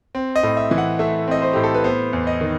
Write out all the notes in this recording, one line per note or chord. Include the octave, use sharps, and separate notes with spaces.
C4
D#5
A2
E5
E3
F#5
A3 E5
C4 D#5
C5
A2 G4
A4
B4
B3 C5
E2
D#5
D#3